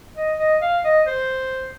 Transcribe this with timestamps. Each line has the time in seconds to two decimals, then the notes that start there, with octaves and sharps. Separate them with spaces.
0.17 D#5
0.39 D#5
0.62 F5
0.84 D#5
1.07 C5